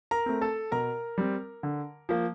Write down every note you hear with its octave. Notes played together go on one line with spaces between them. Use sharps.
A#4 A#5
A3 C4
A4 A5
B2 A#4 A#5
G3 C4
D3
F3 A#3